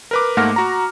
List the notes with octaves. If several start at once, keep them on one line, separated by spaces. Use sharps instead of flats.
A#4 B4 D6
G#2 A3 A#3 F#5 F6 A#6
F#4 A#5